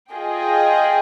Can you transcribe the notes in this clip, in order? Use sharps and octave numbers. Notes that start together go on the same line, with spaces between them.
F4 G#4 D#5 G5